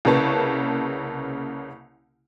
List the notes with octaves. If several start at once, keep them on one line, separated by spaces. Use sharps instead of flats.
C2 C#3 A#3 B4 A5 C#6